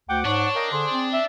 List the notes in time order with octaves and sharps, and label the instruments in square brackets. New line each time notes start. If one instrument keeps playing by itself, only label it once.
[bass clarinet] D2 [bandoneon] F#5 D6 [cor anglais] G5
[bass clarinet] G#2 [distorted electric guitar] D4 [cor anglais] C#5
[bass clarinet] A#4 [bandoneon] D#5 F5 G5
[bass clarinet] D3 [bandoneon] G#4 [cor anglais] C5
[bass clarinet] C4
[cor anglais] E5